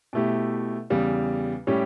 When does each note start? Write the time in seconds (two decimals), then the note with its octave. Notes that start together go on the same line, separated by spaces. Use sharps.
0.13 B2 A3 E4 G4
0.90 E2 C#3 G3
1.67 A2 G3 C#4 E4 G4